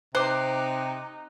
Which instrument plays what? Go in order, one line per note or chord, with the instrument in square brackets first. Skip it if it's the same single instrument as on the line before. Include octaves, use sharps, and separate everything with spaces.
[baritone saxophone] C3 [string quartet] D#4 [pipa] C5 [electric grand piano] D6 F#6